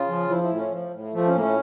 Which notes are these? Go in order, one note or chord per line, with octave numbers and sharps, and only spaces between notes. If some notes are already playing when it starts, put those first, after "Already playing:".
Already playing: C#3 F4
F3
F3 E4
E4
A2
C#4
F3
A2
F3 A3
C#4
A2 A#3
C#4